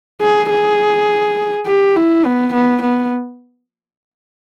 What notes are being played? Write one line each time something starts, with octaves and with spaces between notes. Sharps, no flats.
G#4
G#4
G4
E4
B3
B3
B3